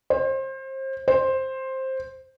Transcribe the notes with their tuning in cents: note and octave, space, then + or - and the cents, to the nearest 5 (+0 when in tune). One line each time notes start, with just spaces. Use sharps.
C5 +30
C5 +10